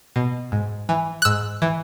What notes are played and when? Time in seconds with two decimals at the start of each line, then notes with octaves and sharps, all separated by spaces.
0.16 B2
0.52 G#2
0.89 E3
1.22 F#6
1.25 G#2 E6
1.62 E3